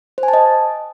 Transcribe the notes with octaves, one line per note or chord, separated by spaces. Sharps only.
C5
G#5
A5
D#5